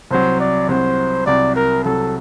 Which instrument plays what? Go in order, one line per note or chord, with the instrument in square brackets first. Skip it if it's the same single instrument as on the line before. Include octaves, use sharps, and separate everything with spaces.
[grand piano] C2 C3 F#3 [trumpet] C5
[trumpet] D5
[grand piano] C2 C3 F#3 [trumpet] C5
[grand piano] C2 C3 F#3 [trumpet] D5
[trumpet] A#4
[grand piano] C2 C3 F#3 [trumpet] A4